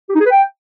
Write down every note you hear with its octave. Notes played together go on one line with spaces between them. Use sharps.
G4
D#4
G#4
B4
G5